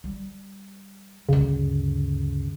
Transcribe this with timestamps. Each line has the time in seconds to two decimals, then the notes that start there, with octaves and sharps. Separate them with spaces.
0.04 G3
1.29 D2 G2 C#3